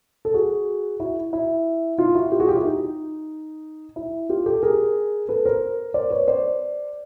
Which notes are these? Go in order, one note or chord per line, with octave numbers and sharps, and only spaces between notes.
A4
F#4 G#4
E4 F#4
E4
D#4 F4
E4 F#4
F4 G4
F#4 G#4
F4 G4
E4
D#4
E4
F4 G4
G4 A4
G#4 A#4
A4 B4
A#4 C5
C5 D5
B4 C#5
C5 D5